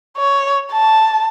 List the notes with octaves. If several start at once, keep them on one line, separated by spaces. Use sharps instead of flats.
C#5
A5